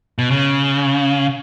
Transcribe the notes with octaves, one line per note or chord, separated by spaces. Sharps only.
B2
C#3